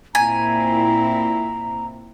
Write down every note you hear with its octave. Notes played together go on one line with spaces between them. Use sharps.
A#2 C4 E4 G#5 A#5